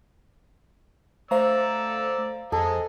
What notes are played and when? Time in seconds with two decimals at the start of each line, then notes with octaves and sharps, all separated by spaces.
1.31 A3 C5 D5 F5 A#5 E6
2.52 F2 G#4 A4 D#5